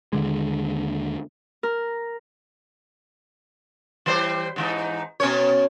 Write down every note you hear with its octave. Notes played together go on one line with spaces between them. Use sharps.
D#2 D3 G#3
A#4
E3 G3 C5
G#2 E3 D#4
B2 C#4 C#5